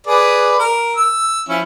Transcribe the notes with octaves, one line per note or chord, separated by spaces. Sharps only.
G#4 B4 D5
A#4
E6
F3 C#4 E4